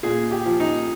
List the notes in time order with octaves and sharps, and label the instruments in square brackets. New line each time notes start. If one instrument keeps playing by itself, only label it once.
[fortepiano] A#2 G#4
G4
F3
D#4